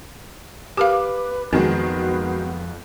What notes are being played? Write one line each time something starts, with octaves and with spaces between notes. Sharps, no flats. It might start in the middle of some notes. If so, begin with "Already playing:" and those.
G4 A#4 B4 F5 D6
F2 D#3 F#3 G#3 B3 C4